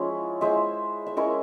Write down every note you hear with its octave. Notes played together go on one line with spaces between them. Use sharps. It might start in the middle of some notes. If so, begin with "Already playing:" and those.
Already playing: F3 G#3 C#4 E4 C6
G#3 E4 C5 E5
E5
G#3 C#4 E4 A#4 C#5